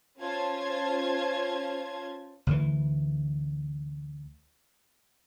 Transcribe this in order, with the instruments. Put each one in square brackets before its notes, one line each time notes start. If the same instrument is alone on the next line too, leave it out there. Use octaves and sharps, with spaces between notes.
[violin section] C#4 F4 C5 A5 G#6
[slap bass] D2 E3